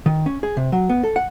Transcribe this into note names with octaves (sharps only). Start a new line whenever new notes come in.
D#3
C#4
G#4
C3
F#3
B3
A4
F#5